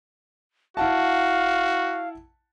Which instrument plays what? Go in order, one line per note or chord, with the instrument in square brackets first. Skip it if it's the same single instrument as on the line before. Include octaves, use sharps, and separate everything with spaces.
[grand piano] E4 F#5 A5 [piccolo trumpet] F#4 [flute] F5